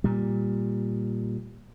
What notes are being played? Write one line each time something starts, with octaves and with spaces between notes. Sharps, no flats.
A#2 G3